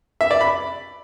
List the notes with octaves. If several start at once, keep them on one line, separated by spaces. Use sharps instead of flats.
E5
D5
B5